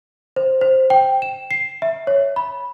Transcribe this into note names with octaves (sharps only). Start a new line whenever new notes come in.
C5
C5
G5
E7
C7
E5
C#5
B5